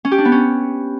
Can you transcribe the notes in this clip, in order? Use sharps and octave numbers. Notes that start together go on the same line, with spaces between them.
C#4
G4
D4
B3
C#4